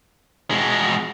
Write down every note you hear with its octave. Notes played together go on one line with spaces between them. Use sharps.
B2 G#3